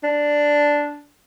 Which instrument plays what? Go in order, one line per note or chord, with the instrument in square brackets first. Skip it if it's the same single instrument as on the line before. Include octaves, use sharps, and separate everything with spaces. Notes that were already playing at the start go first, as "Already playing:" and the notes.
[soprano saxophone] D4